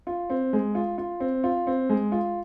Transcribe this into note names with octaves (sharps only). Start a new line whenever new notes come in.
F4
C4
G#3
F4
F4
C4
F4
C4
G#3
F4